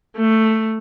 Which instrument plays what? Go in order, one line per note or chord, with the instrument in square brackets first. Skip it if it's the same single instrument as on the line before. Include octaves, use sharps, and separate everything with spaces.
[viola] A3